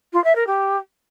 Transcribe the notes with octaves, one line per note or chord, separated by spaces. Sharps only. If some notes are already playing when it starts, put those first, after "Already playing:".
F4
E5
A#4
G4